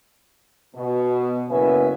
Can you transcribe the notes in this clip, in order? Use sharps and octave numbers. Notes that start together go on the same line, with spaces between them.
B2
F#1 B3 C#4 B4 E5 G#5